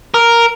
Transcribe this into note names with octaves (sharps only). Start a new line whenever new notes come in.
A#4